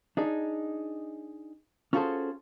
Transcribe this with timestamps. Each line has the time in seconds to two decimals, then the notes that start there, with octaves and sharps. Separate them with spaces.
0.17 D4 D#4 G#4
1.93 C#4 F4 F#4 G#4 A4 C5